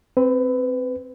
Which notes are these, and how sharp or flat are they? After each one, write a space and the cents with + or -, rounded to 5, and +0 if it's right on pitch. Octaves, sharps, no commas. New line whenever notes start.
C4 +0 B4 +25